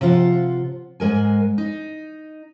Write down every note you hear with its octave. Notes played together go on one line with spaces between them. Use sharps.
C3 F3 F4 F#5
G#2 G#3 A#4 G#5
D#4